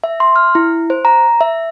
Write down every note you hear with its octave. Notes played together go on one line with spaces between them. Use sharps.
E5
C6
F6
E4
C5
A#5
E5